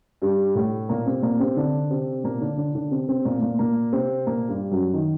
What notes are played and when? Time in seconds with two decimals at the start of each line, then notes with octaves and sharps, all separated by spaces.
0.22 G2 G3
0.55 A2 A3
0.89 A#2 A#3
1.06 C3 C4
1.23 A#2 A#3
1.40 C3 C4
1.57 D3 D4
1.90 C3 C4
2.24 A#2 A#3
2.41 D3 D4
2.57 D3 D4
2.75 D3 D4
2.91 C3 C4
3.08 C3 C4
3.25 A#2 A#3
3.42 A#2 A#3
3.59 A#2 A#3
3.93 C3 C4
4.27 A#2 A#3
4.49 G2 G3
4.71 F#2 F#3
4.94 D#3